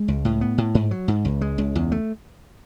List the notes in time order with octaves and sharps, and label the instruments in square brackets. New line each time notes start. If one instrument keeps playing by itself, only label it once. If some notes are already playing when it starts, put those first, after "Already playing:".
Already playing: [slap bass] G#3
C#2
A2
B3
A2
G#2
F#3
G#2
C#2
G#3
C#2
E2
A3